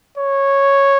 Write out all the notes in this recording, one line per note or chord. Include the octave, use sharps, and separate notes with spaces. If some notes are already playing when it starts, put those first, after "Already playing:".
C#5